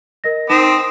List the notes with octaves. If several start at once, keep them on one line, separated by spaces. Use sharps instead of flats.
A#4 D#5 A#6
C4 D#4 D#6 A#6 E7